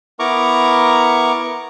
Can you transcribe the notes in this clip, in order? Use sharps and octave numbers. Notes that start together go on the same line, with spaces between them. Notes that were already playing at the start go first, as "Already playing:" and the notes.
B3 E4 A#4 A#5 C#6 D6